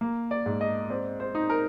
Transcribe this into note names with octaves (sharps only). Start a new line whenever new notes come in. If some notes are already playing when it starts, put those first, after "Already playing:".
A#3
D5
G#2
D#5
C4 D5
C5
D#4
A#4